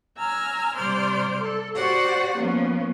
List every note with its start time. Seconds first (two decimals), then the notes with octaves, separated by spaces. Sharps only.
0.18 G#5 A#5 E6 F6
0.75 C3 G3 C5 D5 C6 F6
1.41 A4
1.75 F#4 G4 C5 D5 F#5
2.37 F3 A#3 B3 C#4